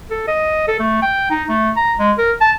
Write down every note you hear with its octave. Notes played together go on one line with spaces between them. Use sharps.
A4
D#5
A4
A3
G5
D#4
A3
A#5
G#3
A#4
A5